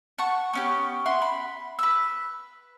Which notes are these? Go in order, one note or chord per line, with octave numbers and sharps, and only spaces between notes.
F#5 A5 C#6
B3 C#4 G4
E5 F#5 C6
B5
B4 E6